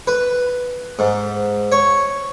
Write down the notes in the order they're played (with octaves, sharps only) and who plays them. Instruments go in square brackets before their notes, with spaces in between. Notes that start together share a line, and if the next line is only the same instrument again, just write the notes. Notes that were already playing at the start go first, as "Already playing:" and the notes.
[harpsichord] B4
G#2
C#5